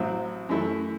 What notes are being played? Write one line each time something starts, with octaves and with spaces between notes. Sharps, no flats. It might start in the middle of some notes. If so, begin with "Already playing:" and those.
Already playing: A1 A2 F#3 C4 E4
F#2 E3 A3 E4